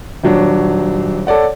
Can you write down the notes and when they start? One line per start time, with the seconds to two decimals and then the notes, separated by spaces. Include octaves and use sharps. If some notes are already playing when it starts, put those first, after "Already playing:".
0.24 D#1 F#3 D4
1.27 A4 C#5 D5 F#5